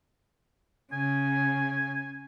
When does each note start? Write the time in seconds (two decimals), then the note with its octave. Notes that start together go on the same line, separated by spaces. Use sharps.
0.92 C#3 G#5